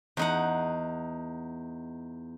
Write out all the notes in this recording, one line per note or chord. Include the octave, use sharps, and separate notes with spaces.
E2 D#4 F#5